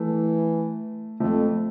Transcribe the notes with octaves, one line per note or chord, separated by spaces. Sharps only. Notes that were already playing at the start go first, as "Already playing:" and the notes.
Already playing: E3 A3
F2 A3